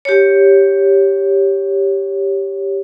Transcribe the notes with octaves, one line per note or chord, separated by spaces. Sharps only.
G4 C#5